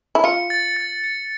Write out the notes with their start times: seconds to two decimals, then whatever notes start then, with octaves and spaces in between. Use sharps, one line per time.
0.15 E4
0.24 F4 C#7
0.50 A6
0.77 A6
1.04 C#7